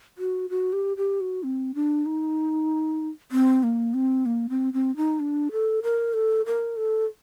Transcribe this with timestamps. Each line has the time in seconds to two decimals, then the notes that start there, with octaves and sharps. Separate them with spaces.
0.18 F#4
0.50 F#4
0.73 G4
0.97 G4
1.21 F#4
1.43 C4
1.75 D4
2.06 D#4
3.32 C4
3.63 A#3
3.94 C4
4.26 A#3
4.49 C4
4.73 C4
4.97 D#4
5.20 D4
5.52 A4
5.83 A#4
6.14 A4
6.46 A#4
6.77 A4